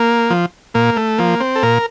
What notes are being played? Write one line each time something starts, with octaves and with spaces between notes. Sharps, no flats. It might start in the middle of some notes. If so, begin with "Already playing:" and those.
Already playing: A#3
F3
A#2 A#3
A3
F3 A#3
C4
A4
A#2 A#4